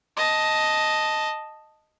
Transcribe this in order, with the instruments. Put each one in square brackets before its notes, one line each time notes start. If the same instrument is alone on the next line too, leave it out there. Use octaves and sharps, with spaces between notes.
[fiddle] D#5 A5